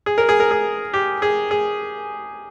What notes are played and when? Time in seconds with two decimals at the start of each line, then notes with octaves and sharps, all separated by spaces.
0.06 G#4
0.18 A#4
0.29 G#4
0.40 A#4
0.51 G#4
0.94 G4
1.22 G#4
1.51 G#4